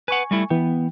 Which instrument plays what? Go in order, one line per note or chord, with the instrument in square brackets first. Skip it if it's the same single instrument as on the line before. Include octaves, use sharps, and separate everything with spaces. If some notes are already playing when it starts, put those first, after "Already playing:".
[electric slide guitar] B4 F#5 [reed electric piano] G#5 C#6
[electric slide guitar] G3 A3 E4
[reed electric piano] E3 G5 [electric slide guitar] B3